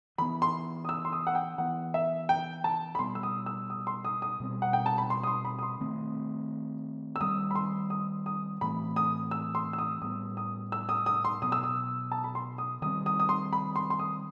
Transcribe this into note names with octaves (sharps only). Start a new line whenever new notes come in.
E3 B3 B5
C6
D#6
E6
C6
D#6
F#5
G5
E3 B3 F#5
E5
G5
A5
B5
B2 G3 B3 C6
E6
D#6
E6
D#6
C6
D#6
D#6
B2 G3 C4
F#5
G5
A5
B5
C6
D#6
C6
B5
D#6
C6
D#3 A3 C4
E6
D#3 G3 C4 D#6
B5
C6
D#6
D#6
A2 E3 A3 C4 B5
D#6
E6
C6
E6
D#6
A2 G3 B3 D#6
D#6
E6
D#6
D#6
C6
B2 F#3 B3 D#6
E6
D#6
A5
B5
C6
D#6
D#3 G3 C4 D#6
D#6
D#6
C6
B5
C6
C6
D#6